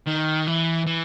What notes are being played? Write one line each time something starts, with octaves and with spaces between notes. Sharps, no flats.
D#3
E3
E3